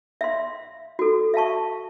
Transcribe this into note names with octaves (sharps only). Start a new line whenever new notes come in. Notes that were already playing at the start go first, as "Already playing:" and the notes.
E5 F5 C6
F#4 A4
E5 F5 A5 C#6